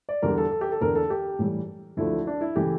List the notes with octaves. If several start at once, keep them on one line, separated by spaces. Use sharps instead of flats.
D5
E2 D3 G3 A#4
A4
A4
G4
A4
E2 D3 A3 A#4
A4
G4
A2 E3 G3
D2 D3 F3 A3 E4
D4
E4
C#3 E3 A3 G4